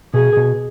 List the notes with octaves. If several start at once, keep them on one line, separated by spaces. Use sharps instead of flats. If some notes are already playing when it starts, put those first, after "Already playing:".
B2 G#4
B2